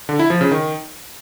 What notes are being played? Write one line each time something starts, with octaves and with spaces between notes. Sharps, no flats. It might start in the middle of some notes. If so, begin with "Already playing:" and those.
D3
E4
F3
C#3
D#3